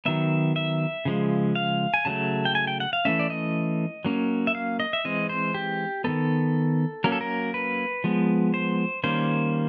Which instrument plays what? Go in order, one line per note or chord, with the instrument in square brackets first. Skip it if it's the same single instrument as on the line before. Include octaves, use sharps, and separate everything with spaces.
[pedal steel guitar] D#3 F#3 B3 E5
E5
C#3 F3 G#3
F5
G#5
C#3 F#3 A3 A5
G5
G#5
G5
F#5
F5
E3 A3 C#4 E5
D5
D#5
F#3 A#3 C#4
E5
F5
D#5
E5
E3 G#3 C4 D#5
C5
G4
D#3 G3 B3 A4
F#3 A#3 C#4 A#4
A4
A#4
B4
F3 G#3 B3
C5
D#3 G3 A#3 C#4 C5